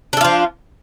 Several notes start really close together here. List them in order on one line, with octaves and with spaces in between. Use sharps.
D4 A4 F4 F3